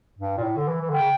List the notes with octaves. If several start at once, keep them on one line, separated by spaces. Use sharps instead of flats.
G2
A#2
A2
D3
E3
E3
D3 G5
C#3